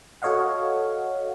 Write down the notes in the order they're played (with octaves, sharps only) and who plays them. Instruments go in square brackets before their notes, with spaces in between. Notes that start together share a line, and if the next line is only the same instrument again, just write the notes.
[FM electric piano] F#4 A4 C#5 D#5 F5 F#5